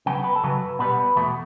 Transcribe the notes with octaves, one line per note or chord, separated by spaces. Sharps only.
C#3 F#3 B3 G5
B4
A4
F#2 C#3 F#3 B4
B2 G3 B3 B4
E2 B2 A3